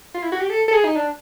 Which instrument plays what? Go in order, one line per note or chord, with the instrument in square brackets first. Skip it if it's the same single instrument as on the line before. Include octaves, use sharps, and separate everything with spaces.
[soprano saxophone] F4
E4
F#4
G4
A4
A4
G#4
D#4
D4